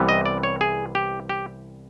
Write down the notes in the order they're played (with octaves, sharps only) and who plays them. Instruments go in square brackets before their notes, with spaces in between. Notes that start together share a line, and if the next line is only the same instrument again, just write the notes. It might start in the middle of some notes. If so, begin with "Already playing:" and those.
Already playing: [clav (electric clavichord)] C2 C3 E3 G3 B3
D#5
D5
C#5
G#4
G4
G4